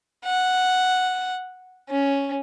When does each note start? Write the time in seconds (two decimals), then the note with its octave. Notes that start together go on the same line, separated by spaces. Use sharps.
0.25 F#5
1.90 C#4